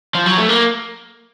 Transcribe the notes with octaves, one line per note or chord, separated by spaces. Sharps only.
F3
F#3
A3
A#3